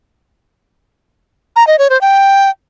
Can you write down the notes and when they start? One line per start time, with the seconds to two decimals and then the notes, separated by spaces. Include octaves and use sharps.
1.56 A#5
1.67 D#5
1.79 C#5
1.90 C5
2.01 G5